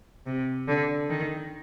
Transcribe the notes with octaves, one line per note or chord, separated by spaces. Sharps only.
C3
D3
D#3